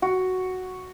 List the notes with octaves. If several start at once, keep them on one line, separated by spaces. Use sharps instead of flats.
F#4